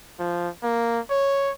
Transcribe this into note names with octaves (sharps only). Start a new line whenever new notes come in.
F3
A#3
C#5